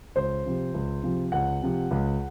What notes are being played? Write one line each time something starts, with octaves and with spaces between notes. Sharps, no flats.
C#2 C5
C3 F3
C#2
C3 F3
C#2 F#5
C3 F3
C#2